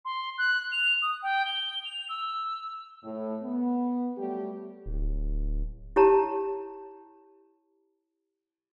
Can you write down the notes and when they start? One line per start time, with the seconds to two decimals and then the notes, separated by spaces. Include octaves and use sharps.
0.05 C6
0.38 F#6
0.71 F7
1.02 D#6
1.22 G5
1.45 G7
1.84 F7
2.09 E6
3.03 A2
3.42 B3
4.17 F#3 G3 A3 G4
4.86 D1
5.96 E4 G4 C#5 A5 A#5